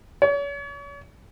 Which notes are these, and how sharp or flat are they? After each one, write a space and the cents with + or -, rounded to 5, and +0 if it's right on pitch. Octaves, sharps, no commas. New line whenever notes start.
C#5 +40